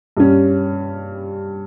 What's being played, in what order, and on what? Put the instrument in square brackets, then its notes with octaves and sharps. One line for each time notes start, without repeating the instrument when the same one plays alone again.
[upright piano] G2 G3 C#4